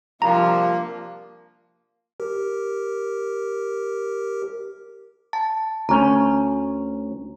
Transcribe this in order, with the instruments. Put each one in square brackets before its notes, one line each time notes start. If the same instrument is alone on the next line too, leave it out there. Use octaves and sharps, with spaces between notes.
[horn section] C3 G3 D4 [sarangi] F3 [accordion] A#3 [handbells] A#5
[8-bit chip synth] G4 A#4
[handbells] A5 A6
[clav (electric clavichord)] D2 C#4 [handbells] A#5